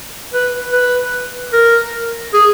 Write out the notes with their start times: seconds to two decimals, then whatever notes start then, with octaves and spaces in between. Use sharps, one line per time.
0.33 B4
0.73 B4
1.53 A#4
2.34 G#4